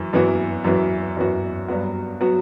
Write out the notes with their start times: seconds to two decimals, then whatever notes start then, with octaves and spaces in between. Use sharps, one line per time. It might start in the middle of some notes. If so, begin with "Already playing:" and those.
Already playing: F#2 E3
0.13 F#2 E3 B3 F#4
0.64 F#2 E3 B3 F#4
1.16 F#2 E3 B3 F#4
1.68 G2 F#3 B3 F#4
2.21 F#3 B3 F#4